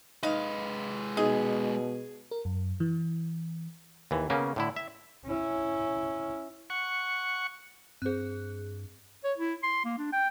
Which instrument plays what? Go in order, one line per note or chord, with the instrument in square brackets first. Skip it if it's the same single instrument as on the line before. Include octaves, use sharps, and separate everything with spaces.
[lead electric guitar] G#3 B4 [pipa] D#4 F5
[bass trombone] B2 [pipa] D#4 [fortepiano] G#4
[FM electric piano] A#4
F#2
E3
[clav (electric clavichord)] D#2 E3
C#3 A#3 B3 C#4
A2 D3 E4
E5
[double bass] C#4 E4
[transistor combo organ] F#5 C#6
[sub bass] G2 [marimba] C4 C5 [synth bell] G#4 F#6
[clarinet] C#5
E4
C6
A#3
D4
G5